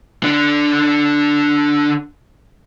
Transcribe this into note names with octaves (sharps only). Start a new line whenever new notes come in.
D3 D4